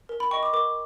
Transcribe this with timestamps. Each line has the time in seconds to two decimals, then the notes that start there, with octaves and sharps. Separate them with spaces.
0.09 A#4
0.20 B5
0.31 D#5 G5 C#6
0.43 D6
0.53 A#4 D6